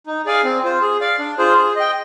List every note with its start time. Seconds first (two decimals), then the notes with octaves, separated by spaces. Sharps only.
0.07 D#4
0.26 G#4 D5 F5 G#5
0.44 C4
0.63 F4 C5
0.82 G#4
1.00 D5 F5
1.19 D4
1.38 F4 G#4 C5
1.57 G#4
1.76 D#5 G5